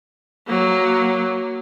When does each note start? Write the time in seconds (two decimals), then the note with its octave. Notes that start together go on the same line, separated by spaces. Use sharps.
0.47 F#3 A#3